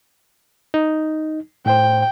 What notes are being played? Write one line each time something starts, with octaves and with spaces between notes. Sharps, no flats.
D#4
A2 C5 G5